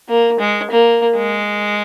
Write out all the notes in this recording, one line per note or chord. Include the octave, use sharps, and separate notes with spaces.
A#3
G#3
A#3
G#3